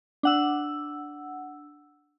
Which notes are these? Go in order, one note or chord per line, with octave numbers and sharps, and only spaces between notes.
D4 F#5 E6